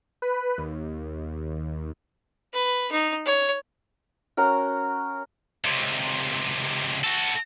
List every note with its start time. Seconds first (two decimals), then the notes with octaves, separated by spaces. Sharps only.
0.22 B4
0.58 D#2
2.53 B4
2.91 D#4
3.25 C#5
4.37 C#4 F#4 A#4
5.64 C#2 C3
7.04 F#4 A4